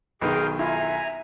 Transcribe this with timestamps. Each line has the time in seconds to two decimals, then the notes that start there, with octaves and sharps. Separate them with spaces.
0.21 B1 D#3 G#4 D#5 F5 G5
0.59 E4 F4 E5 G#5 A#5